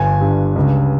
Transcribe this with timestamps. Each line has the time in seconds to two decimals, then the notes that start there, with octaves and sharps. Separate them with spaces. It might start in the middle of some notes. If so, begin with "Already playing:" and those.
Already playing: G1 G#5
0.21 G2
0.56 C#2